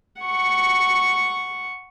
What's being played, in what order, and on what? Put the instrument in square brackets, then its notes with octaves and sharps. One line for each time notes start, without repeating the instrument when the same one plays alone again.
[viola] F#5 C#6